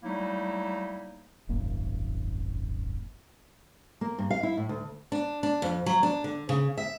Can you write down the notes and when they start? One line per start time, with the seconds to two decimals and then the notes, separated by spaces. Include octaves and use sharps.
0.03 F#3 G3 A3 A#3 D#4 E4
1.49 D#1 G#1 F#2 A#3
4.01 A#3
4.18 G2
4.30 F5
4.43 E4
4.57 A2
4.69 D2
5.12 D4
5.43 D4
5.62 F2
5.86 F#3
6.03 D4
6.24 D3
6.49 C#3
6.78 E5